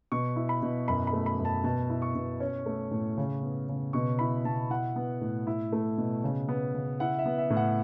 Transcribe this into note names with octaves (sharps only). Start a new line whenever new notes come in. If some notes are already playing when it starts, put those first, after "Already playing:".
B2 C#6
E4
B5
B2
F#2 B5
B5
A3
B5
F#2
A5
B2 A5
E4
C#6
B2
C#4
A3
A2
C#3
B3
C#3
B2 C#6
E4 B5
B2 A5
E4 F#5
B3
A2
E4
A3
B2
C#3
B3
C#3
E4 F#5
E5
B3
E5
A2
F#5